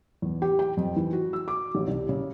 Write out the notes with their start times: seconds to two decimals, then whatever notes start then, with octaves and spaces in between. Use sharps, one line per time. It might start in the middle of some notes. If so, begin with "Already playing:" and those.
0.22 E2
0.42 G4
0.59 G5
0.77 F2
0.96 E3
1.13 F#4
1.33 E6
1.48 D6
1.75 A1
1.87 C2
2.09 C#3